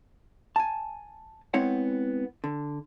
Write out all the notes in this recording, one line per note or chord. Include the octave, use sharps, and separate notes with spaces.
G#5 A5
G#3 B3 C4 E4 C#5 F#5
D3